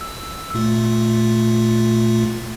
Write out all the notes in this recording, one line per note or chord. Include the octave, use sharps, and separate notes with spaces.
E6
A#2 A3 F4